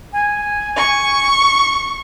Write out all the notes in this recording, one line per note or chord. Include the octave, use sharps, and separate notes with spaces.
G#5
C#6